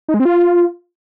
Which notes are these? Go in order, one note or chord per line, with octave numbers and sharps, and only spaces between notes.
D#4
G#3
C4
F4